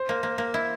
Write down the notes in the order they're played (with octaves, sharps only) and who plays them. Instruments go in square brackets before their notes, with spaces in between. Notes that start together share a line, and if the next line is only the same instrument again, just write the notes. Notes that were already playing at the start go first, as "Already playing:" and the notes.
Already playing: [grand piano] C5
[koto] A#3
A#3
A#3
E4